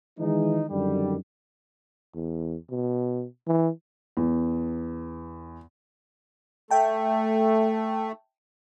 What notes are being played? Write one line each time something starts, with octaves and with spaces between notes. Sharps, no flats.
D#3 E3 G#3 D#4
F#2 D3 D#3 G3
E2
B2
E3
E2
A3 E5 G5 A5